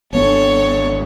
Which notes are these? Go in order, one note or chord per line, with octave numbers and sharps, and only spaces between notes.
G#1 B3 D4 A4 C#5